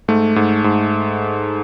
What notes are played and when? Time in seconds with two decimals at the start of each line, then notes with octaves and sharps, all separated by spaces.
0.08 G#2 A3
0.36 G#2
0.64 G#2